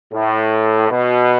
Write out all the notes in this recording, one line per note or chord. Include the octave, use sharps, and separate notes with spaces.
A2
B2